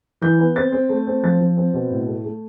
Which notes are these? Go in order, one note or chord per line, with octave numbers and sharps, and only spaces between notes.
E3 G6
B3
C4 A6
C4
A3
C4
F3 A6
F3
C4
B2
A2
A3
A3